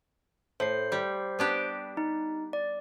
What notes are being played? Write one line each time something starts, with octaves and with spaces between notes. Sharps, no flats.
A2 C5 C7
G3
B3 D4 G4
D#4
D5